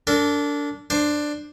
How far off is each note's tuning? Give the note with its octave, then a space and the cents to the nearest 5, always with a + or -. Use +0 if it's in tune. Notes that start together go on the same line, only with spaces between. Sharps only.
D4 -20 A#4 -45
D4 +10 C5 +0